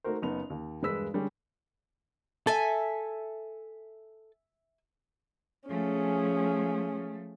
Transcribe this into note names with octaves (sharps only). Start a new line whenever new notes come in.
A3 D#4 F#4 A#4 C5
F#1 B3 D#4 F7
D#2
E1 G2 G#3 B4 E6 B6
D3 G3 G#3 C#4
A4 E5 G#5
F3 A3 C#4 G#4